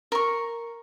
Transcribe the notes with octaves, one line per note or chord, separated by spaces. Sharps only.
A#4 C#6